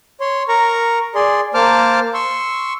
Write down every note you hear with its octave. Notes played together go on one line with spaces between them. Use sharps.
C#5 C6
A#4 A#5 C#6
G#4 D5 C6
A#3 C5 A5 D6 F6
C6 C#6 E6